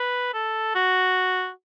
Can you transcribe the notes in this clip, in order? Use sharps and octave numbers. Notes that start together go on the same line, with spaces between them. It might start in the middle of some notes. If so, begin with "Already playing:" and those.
Already playing: B4
A4
F#4